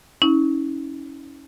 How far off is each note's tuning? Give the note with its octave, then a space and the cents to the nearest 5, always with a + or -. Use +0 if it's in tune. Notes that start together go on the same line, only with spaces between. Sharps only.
C#4 +0 E4 -45